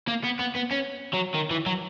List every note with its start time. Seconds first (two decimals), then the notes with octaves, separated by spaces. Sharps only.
0.08 A#3
0.24 B3
0.40 B3
0.56 B3
0.72 C#4
1.14 F#3
1.35 D#3
1.51 E3
1.66 F#3